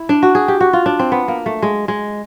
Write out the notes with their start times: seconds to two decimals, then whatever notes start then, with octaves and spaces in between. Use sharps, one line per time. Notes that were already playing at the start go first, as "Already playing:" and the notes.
Already playing: E4
0.09 D4
0.23 F#4
0.35 G#4
0.48 G4
0.61 F#4
0.73 F4
0.86 D4
0.99 C4
1.12 B3
1.28 A#3
1.46 A3
1.62 G#3
1.88 G#3